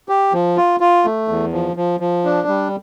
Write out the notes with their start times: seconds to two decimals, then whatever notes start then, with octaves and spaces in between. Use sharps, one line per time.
0.09 G4
0.33 F3
0.57 F4
0.80 F4
1.05 A3
1.28 E2
1.53 F3
1.76 F3
2.00 F3
2.25 D4
2.48 G3